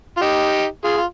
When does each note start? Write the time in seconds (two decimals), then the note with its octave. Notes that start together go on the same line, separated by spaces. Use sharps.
0.17 F4
0.21 D#4 G4
0.84 F4 G#4
0.97 F4